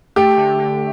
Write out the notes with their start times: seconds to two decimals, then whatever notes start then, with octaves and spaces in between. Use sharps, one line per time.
0.16 A3 G4
0.37 D3
0.58 D3